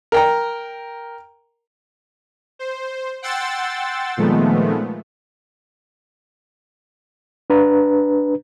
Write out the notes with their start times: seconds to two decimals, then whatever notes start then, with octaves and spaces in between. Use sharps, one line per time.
0.12 A#4 G5 A#5
2.59 C5
3.22 F#5 G5 C6 E6 A6
4.17 A#2 D#3 F3 G#3 A3 B3
7.50 D4 B4 A#5